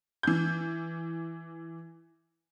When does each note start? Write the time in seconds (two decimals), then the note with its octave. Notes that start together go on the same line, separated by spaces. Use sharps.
0.23 E3 G6